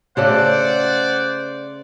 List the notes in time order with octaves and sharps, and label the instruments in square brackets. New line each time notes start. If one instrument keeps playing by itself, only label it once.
[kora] C#3 A3 A4 [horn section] C5 D5 [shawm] F#5